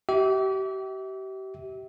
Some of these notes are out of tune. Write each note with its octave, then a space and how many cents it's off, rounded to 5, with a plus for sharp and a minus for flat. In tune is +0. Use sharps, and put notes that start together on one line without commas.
G4 -35 E5 -30